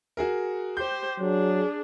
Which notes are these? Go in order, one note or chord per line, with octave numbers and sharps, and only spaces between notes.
F#4 G#4 A#4
G4 C5 G6
F#3 D4 G#4